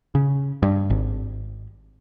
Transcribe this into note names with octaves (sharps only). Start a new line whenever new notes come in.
C#3
G2
G#1